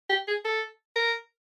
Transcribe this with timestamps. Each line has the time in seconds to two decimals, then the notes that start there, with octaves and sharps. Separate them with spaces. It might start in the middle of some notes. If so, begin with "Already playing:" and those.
0.09 G4
0.27 G#4
0.45 A4
0.96 A#4